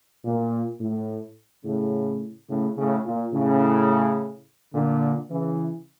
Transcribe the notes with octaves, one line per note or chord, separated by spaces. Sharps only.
A#2
A2
A2 C#3
A2 C#3
A2 C#3
A#2
A2 C#3
A#2 D3
C#3 E3